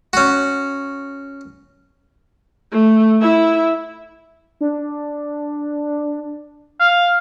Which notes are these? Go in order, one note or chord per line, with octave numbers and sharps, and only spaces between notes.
C#4 F#4
A3
E4 E5
D4
F5